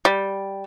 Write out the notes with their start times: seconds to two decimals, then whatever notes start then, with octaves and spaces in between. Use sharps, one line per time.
0.05 G3